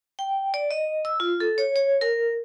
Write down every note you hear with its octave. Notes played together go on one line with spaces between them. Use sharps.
G5
D5
D#5
E6
F4
A4
C#5
C#5
A#4